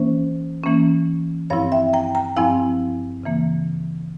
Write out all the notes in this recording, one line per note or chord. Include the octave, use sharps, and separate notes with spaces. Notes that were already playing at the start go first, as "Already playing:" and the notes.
Already playing: E3 A#3 C#4 C5
E3 A#3 C#4
G2 F3 C4 E4 C#5 F5
E5 G5
G5 A#5
G5 A#5
G2 F3 C4 E4 F5 G#5
C#3 E3 A#3